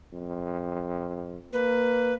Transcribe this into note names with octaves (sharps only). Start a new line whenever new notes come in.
F2
A#3 B4